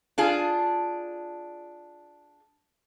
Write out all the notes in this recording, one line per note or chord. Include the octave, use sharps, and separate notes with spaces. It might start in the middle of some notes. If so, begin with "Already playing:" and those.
D4 F4 G#4